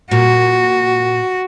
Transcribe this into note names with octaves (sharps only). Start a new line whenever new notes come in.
A#2 F#4